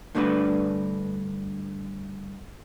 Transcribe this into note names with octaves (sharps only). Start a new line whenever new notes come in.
G2 D3 A3 D4 F#4 B4